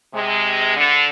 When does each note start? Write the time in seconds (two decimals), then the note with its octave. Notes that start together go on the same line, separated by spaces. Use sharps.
0.13 C3 G#3
0.76 D3